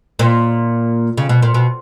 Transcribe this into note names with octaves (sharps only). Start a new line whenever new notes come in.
A#2
C#3
B2
A#2
B2